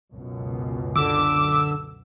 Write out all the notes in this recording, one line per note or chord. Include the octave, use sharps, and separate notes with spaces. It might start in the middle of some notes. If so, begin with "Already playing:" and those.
C#2 F#2 B2
D3 D6 E6